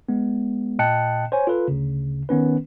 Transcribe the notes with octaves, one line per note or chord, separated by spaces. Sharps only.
G#3 B3
A#2 D#5 G5 A5 F#6 C#7
C5 C#5 G#5
F4 A4 B4
D2 C#3
D#3 B3 C#4 B4